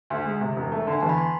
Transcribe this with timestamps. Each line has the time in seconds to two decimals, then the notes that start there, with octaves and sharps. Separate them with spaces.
0.10 D2
0.25 G#3
0.41 C3
0.56 E1
0.72 A3
0.87 D3
0.92 G#5
1.00 E2 A5
1.09 B5
1.18 C6